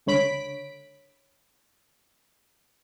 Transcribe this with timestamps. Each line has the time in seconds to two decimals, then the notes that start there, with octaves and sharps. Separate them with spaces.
0.06 C#2 D3 C#5 B5 B6 D7